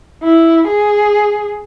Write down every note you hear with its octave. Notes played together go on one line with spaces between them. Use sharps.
E4
G#4